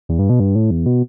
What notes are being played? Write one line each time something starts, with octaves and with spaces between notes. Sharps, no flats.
E2
G2
B2
G2
A2
E2
B2